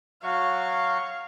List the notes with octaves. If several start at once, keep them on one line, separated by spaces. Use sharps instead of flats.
F#3 F#4 F5 C#6